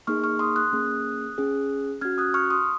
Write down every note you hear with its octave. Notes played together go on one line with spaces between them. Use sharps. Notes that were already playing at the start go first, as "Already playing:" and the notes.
A#3 D#4 G#4 C#6 F6
C#6 F6
C6 D#6
D#6 F#6
A#3 C#4 G#4
C#4 G#4
C#4 F#4 F6 G#6
D#6 F#6
C#6 F6
C6 D#6